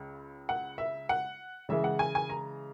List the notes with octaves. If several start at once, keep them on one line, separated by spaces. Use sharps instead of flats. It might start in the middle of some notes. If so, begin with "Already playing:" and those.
Already playing: C#2 C#3
F#5
E5
F#5
C#3 E3 G#3 E5
F#5
G#5
G#5
A#5